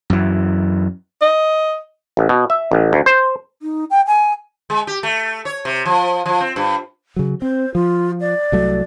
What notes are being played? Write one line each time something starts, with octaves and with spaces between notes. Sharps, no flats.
F#2 E3
D#5
A1
B2
E5
A1
D2
C5
D#4
G5
G#5
G#3
G4
A3
C#5
C3
F3
F3
C4
G2
C#3 F#3
C4 C5
F3 F4
D5
C2 F#3 A3